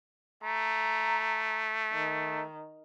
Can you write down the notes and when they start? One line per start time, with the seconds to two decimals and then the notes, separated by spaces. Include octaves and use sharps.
0.44 A3 A#5
1.93 D#3